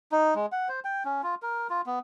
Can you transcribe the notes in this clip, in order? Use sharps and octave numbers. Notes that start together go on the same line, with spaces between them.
D#4
G#3
F#5
C5
G5
C#4
F4
A#4
F4
B3